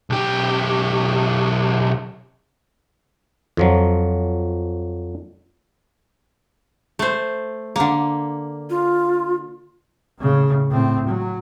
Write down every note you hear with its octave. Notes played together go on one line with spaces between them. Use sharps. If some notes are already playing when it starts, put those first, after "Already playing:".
B1 G4
F2 F3 F#3
A3 C5
D3 A#3
F4
A2 C#3
A2 C4
F#3